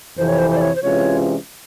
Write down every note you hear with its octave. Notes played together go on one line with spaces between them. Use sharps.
F2 C3 E3 C5
C#5
C5
C5
D5
C#5
C5
C3 E3 G#3 C#4 F4 C#5